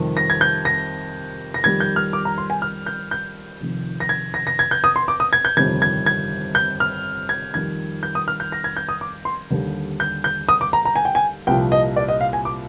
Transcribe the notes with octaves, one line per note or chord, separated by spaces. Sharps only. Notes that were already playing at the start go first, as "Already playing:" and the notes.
Already playing: F2 C3 D#3 G3
A#6
G#6
G6
A#6
A#6
F2 D#3 G3 G#6
G6
F6
D6
A#5
C6
G#5
F6
G6
G6
F1 F2 D#3
A#6
G#6
A#6
A#6
G#6
G6
D#6
C6
D6
D#6
G#6
G6
G1 F2 C3 D#3 G3 G#6
G#6
G#6
G6
F6
G#6
F2 D#3 G3 G#6
G6
D#6
F6
G6
A#6
G#6
G6
D#6
D6
C6
D#2 D3 G3
G6
G6
D#6
D6
A#5
A#5
G#5
G5
G#5
C2 A#2 F3 G5
D#5
D5
D#5
F5
G#5
D6